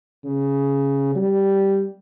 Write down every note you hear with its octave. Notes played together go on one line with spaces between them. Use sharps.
C#3
G3